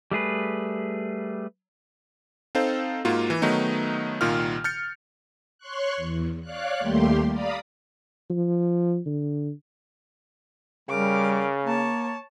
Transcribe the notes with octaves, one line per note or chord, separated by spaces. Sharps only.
G3 A3 G#4 B4
C4 D#4 A4 C5 F5
G#2 A#3 F4 F#4
E3
D#3 F#3 A3 B3 D#4
C2 A#2 D#3 F4 F6
F6 G6 A6 C#7
C#5 C6 C#6 F#6
E2
C#5 D5 F5 F#6
D#2 G3 A3 A#3 G4 C6
D5 F5 A#5 B5 D#6
F3
D3
C#3 G3 A#4 D6
A#3 C#5 A5